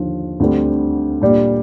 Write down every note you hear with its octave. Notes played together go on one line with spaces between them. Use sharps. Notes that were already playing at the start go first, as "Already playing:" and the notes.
Already playing: D#2 D3 F3
D2 D3 G3 C4
A#2 G3 D4